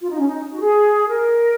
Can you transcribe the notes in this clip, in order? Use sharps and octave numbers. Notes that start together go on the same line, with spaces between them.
F4
D#4
C#4
D#4
F#4
G#4
A#4